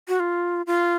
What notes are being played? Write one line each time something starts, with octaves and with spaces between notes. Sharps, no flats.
F#4
F4
F4